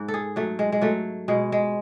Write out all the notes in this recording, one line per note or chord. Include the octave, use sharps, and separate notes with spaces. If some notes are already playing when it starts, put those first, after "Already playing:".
Already playing: G#2
A4
G#4
F#3 A3
G#3
G#3
F#3 A3
B2 G#3
G#3